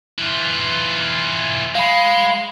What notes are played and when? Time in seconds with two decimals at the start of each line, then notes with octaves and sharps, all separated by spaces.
0.18 E3 F4
1.75 G#3 F5 B5